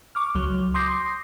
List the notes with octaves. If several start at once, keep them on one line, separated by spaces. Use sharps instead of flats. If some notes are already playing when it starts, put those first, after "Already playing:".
C#6 D6 F6
C#2 F#3
C6 D6 D#6 G6 A#6 C7